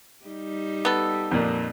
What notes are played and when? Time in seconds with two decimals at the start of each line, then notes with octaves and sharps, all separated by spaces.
0.25 G3 D#4 G4
0.85 B3 A4
1.31 F2 A#2